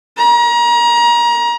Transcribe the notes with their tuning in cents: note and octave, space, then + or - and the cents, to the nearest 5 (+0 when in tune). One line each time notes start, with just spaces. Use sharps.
A#5 +30